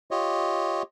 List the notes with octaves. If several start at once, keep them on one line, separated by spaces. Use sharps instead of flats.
F4 G4 C#5 D#5